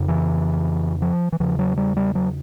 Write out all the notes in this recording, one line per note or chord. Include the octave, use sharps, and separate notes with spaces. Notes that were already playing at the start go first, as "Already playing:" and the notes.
Already playing: F2 C#3
E3
F3
E3
E2 C#3 F3
F#3
G3
G3
F#3